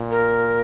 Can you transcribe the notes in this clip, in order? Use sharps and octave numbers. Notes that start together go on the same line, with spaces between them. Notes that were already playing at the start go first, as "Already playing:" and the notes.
Already playing: A#2
A#4